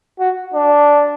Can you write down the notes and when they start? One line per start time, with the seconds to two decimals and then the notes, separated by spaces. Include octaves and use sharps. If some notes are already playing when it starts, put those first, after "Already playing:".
0.19 F#4
0.54 D4